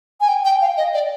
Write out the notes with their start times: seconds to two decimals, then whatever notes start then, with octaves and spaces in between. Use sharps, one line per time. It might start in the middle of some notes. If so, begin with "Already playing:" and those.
0.21 G#5
0.28 G5
0.45 G5
0.61 F5
0.77 D#5
0.94 D5